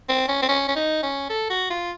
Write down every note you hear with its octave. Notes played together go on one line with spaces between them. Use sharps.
C4
C#4
C4
C#4
C#4
D#4
C#4
A4
F#4
F4